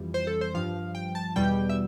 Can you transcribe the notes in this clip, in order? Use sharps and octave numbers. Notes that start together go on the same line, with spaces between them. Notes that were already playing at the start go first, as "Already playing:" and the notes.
Already playing: F2 E3 G3
C5
A4
C5
G2 F3 F5
G5
A5
E2 B2 G3 G5
E5